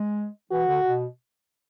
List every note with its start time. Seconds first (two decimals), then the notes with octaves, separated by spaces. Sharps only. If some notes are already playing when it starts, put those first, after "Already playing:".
Already playing: G#3
0.51 E3 F#4
0.67 D3
0.83 B2